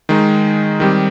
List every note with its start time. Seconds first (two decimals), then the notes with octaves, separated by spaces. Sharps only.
0.09 D#3 G#3 D#4
0.80 D#3 G3 C4 G4